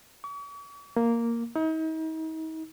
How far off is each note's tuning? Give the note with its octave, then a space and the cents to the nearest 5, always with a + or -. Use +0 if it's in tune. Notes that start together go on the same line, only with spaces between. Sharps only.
C#6 +45
A#3 -5
D#4 +40